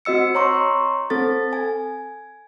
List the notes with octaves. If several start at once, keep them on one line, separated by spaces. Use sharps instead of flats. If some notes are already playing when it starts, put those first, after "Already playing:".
C4 F#4 D#5 E6 C#7
C#5 A#5 C6 C#6
C4 A4 A6
G#5